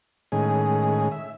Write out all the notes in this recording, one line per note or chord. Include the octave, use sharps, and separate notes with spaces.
A2 D#3 G#3 C#4 G#4
E5